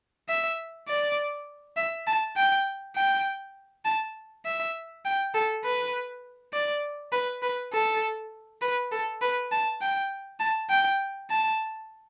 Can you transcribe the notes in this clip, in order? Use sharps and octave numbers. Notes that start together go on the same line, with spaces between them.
E5
D5
E5
A5
G5
G5
A5
E5
G5
A4
B4
D5
B4
B4
A4
B4
A4
B4
A5
G5
A5
G5
A5